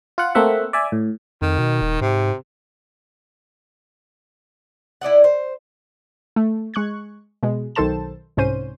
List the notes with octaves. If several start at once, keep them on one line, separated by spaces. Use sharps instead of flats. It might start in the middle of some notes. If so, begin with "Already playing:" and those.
F4 F#5
A3 A#3 C4 E5 F#5
D5 E5 G#5
A2
F2 D#3
B2
D#1
G#2 C3
E4 D5 D#5 F#5
C5
A3
G#3 C#6 F#6 G#6
B2 G#3
B1 D#3 A4 C5 A5 E7
C2 G#2 C#4 C5 D#7